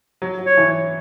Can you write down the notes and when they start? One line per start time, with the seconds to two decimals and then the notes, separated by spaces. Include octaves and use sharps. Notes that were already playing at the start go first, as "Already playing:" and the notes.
0.22 F#3
0.39 F#3
0.46 C#5
0.57 E3
0.70 C#5